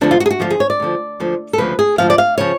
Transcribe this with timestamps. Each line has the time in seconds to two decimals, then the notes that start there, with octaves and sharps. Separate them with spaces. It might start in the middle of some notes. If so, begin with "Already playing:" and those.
0.01 D2 D3 F3 D4
0.11 F4
0.20 F#4
0.26 G#4
0.31 F#4
0.40 D2 D3 F3 F4
0.50 G#4
0.60 C#5
0.70 D5
0.80 D2 D3 F3
1.20 D2 D3 F3
1.53 A4
1.58 D2 C#3 F3 B4
1.79 G#4
1.98 D2 C#3 F3 F5
2.10 D5
2.18 F5
2.38 C#3 F3 C#5